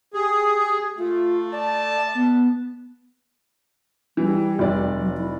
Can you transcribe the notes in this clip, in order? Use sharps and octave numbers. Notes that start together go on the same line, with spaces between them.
G4 G#4
A3 F4
D5 A5
B3
E3 G3
F1 D5
F#3
E4